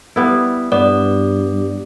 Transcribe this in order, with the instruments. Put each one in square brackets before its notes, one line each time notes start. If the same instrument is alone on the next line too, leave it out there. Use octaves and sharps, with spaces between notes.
[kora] G3 B3 E4
[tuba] G2 [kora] B3 [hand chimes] D5